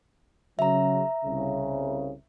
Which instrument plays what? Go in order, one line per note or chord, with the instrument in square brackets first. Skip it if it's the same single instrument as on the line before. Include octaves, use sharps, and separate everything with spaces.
[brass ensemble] C#3 F#3 [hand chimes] E5 A#5
[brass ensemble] C2 C#3